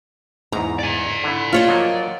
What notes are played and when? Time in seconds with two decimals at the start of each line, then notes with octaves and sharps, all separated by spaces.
0.52 E2 G#2 A#5
0.79 D5 G#5
1.24 D3 E4
1.53 F4 C#5 D#5
1.68 F3 F#3 A#3